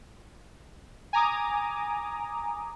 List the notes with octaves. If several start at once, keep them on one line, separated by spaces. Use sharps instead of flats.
G#5 A#5 D6 D#6